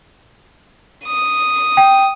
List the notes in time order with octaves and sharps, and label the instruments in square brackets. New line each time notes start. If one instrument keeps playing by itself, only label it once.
[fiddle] D#6
[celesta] G5